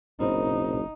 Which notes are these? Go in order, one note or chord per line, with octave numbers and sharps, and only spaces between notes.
F#1 C4 D#4 A#4 B4